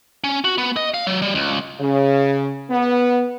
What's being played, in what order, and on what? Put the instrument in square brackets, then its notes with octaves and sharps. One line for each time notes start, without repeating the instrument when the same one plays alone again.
[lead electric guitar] C#4
F#4
B3
D#5
F5
F#3
G3
C#2
[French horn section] C#3
B3